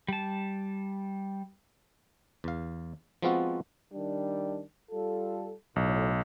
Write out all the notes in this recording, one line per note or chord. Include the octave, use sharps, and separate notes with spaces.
G3 A5
E2 F5
F3 G#3 B3 C4 F4 F#4
D#3 G3 D4
G3 F4 A4
B1 A2